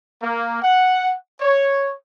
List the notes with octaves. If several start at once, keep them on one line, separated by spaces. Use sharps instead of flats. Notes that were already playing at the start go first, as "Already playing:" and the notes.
A#3
F#5
C#5